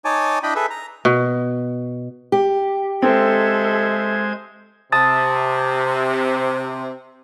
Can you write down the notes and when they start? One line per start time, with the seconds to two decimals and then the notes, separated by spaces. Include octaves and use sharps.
0.05 D#4 C#5 G#5 A5 D6
0.43 D4 E4 D#5 G5 B5
0.55 G#4 A4 B4 E5
0.70 A#5
1.05 B2
2.32 G4
3.02 G#3 C4 A4 C5 E5 G#6
4.92 C3 A5 D#6 A6